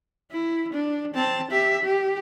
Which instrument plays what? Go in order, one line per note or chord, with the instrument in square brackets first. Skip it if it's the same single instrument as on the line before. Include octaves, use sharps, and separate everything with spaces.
[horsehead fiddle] E4
D4
C4 A5
G4 E5
G4